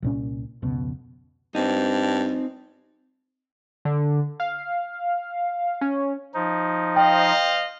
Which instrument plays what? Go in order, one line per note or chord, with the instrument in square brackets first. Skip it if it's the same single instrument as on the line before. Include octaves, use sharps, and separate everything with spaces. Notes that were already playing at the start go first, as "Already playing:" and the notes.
[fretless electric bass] C2 A#2 C#4
F1 C#2 B2
[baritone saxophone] G2 [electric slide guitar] C4 D#4
[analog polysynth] D3
F5
C#4
[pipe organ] F3 D#4
[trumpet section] C5 D#5 F5 [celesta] G5